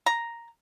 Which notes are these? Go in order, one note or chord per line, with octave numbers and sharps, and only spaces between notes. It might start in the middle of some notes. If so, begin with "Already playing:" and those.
A#5